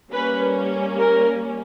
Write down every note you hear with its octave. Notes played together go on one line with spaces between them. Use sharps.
G3 A#3 C#4 B4
A#4